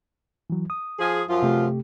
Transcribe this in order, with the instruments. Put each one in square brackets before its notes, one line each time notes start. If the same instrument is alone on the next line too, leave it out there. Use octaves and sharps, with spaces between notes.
[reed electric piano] E3 F#3
D#6
[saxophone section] F3 G#4
F#2 F3 F4
[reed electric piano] C3 A3 G4